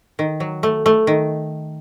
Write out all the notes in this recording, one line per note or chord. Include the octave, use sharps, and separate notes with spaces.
D#3
F#3
A3
A3
D#3